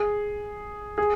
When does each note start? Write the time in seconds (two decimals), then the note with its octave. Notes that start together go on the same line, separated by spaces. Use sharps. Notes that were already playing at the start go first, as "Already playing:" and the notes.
Already playing: G#4
0.98 G#4